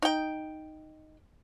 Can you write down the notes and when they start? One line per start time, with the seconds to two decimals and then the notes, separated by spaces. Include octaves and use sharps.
0.02 D#4 G5